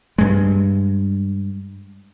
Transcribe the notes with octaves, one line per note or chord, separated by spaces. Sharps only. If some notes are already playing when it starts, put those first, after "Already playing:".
G2 G#3